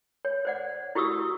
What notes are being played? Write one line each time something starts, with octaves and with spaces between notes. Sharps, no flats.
C#5
C5 D5 F#5
E4 F#4 G4 C#6 D#6 E6